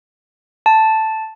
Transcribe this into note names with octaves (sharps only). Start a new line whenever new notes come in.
A5